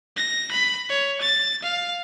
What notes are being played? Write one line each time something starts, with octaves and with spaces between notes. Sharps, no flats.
A#6
B5
C#5
A6
F5